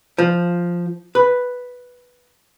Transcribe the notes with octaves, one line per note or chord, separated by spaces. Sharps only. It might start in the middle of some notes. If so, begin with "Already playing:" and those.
F3
B4